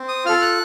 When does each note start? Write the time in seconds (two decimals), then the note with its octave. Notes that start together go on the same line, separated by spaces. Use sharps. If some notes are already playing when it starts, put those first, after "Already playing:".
Already playing: C4
0.08 D#6
0.25 F4 A4 F6
0.42 F#6